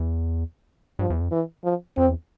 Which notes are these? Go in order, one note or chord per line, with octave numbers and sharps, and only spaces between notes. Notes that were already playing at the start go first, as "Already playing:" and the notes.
Already playing: E2
G2 F3
E2
F2
E3
F3
F2 C4
E2